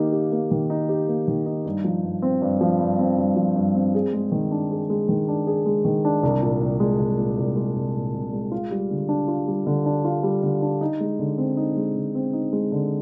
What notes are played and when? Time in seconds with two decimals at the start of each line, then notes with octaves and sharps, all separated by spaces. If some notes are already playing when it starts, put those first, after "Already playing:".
Already playing: D#3 A#3 D#4 G4
0.12 G4
0.32 A#3
0.51 D#3
0.70 D#4
0.89 G4
1.08 A#3
1.28 D#3
1.46 D#4
1.65 G2
1.84 F3
2.04 G2
2.22 C4
2.42 G2
2.61 F3
2.80 G2
2.99 C4
3.18 G2
3.36 F3
3.56 G2
3.75 C4
3.95 G#4
4.13 G#3
4.32 D#3
4.51 D4
4.71 G#4
4.90 G#3
5.09 D#3
5.28 D4
5.47 G#4
5.66 G#3
5.85 D#3
6.05 D4
6.23 C2
6.42 A#2
6.61 C2
6.80 G#3
6.99 C2
7.18 A#2
7.37 C2
7.57 G#3
7.76 C2
7.95 A#2
8.14 C2
8.33 G#3
8.52 F4
8.71 G3
8.91 D3
9.09 D4
9.28 F4
9.48 G3
9.67 D3
9.86 D4
10.04 F4
10.23 G3
10.43 D3
10.62 D4
10.81 D#4
11.00 G#3
11.19 D3
11.38 C4
11.57 D#4
11.76 G#3
11.95 D3
12.15 C4
12.33 D#4
12.53 G#3
12.72 D3